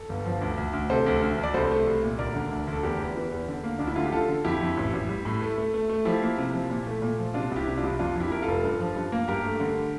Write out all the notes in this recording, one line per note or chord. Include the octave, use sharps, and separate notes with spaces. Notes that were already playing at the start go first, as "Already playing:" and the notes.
Already playing: A4
G1
F3
D2
D2
D2
C3 A4 C5
D2
D2
D2
D5
C2 A4 C5
A3
C2
A#2
D2 A#4 D5
D3
D2
D2
A4
E2 G4 A#4
E2
E3
E2
D3
A#3
D2 D4
E4
D3 F4
G4
D3 F4 A4
D3
F2 E4 G4
F2
A1
A1
G3
A2
A3
A3
A3
A3
F3 E4 G4
A#3
C3
F3
A#2
A3
A#2
F3
C3 D4 F4
C2
E4 G4
C3
D4 F4
C2
F2 D4 F4
F2 E4 G4
F2 A#4
F1 F4 A4
G2
F3
G2
A#3
G2 G4 A#4
A3
D3